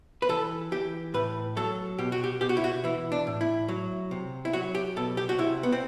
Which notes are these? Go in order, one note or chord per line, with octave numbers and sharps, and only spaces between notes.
B4
E3 A4
E3 G4
A2 B4
F#3 A4
B2 G4
F#4
G4
B2 G4
F#4
E4
F#4
E3 E4
D4
A2
E4
F#3
C3
E4
F#3 F#4
G4
B2 A4
G4
F#4
C3 E4
B3
C4